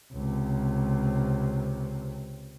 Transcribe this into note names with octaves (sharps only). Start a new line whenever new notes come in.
C#2 C3